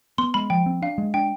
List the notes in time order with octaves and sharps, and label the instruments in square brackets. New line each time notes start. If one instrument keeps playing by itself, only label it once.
[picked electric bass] B3 [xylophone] C6
[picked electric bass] G#3 [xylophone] B5
[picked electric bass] F3 [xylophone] G5
[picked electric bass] C4
[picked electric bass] D4 [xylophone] F5
[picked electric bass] G#3
[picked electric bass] D4 [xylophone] G5